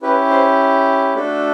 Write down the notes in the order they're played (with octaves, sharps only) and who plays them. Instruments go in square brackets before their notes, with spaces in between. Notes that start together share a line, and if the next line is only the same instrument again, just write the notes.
[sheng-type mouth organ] C#4 E4 G4 B4
C5
A3 D4 F#4 A4